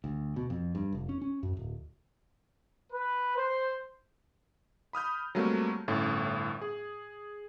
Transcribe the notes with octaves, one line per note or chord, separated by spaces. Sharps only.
D2
B2
F2
G2
F1
C#4
C#4
F#2
D1
B4
C5
B5 D#6 F6 G6
F#3 G3 A3 A#3 C4
G1 A2 A3 C#4
G#4